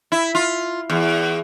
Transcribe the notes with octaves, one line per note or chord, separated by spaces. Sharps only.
E4
F4
E2